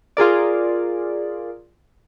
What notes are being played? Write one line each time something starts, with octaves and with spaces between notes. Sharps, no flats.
F4 G#4 A#4 D5